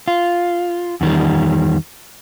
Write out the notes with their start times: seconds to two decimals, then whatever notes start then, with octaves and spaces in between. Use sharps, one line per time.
0.08 F4
1.01 E2 D#3 G3